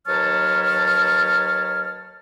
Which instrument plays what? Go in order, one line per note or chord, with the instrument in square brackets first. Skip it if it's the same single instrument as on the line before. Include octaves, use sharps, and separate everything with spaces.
[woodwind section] D#2 F#3 B4 C#5 A5 F6